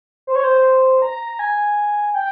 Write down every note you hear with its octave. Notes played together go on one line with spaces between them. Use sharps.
C5
C#5
C5
A#5
A#5
G#5
G5